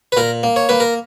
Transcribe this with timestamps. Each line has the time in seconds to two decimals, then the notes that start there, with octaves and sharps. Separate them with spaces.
0.12 B4
0.17 A#2 A#4
0.43 A#3
0.56 C#5
0.69 A#3 B4
0.80 A#4